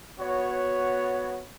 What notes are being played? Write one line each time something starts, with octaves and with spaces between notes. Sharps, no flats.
B3 F#4 C#5